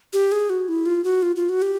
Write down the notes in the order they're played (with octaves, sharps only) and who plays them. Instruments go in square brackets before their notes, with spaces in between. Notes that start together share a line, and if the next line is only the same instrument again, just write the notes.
[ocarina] G4
G#4
F#4
E4
F4
F#4
F4
F4
F#4
G4